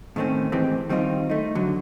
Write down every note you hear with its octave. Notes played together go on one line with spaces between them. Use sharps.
A2 D#3 A3 C4 C#4
A2 D#3 E3 G#3 C4 G4
D#3 G3 C4 D#4 F4
A3 D#4
D3 F#3